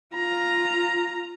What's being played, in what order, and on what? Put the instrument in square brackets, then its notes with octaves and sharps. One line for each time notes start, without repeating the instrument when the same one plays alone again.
[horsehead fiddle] F4 [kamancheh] A#5